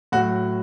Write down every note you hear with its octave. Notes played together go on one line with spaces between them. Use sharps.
A2 F#3 F#4